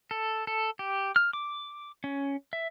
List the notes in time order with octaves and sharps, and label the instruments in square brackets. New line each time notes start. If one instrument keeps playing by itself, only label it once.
[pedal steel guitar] A4
A4
G4
F6
D6
C#4
E5